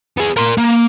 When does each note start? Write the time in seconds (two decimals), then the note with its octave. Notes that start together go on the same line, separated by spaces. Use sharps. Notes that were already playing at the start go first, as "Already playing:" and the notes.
0.17 B3 G#4
0.37 A#4 C6
0.58 A#3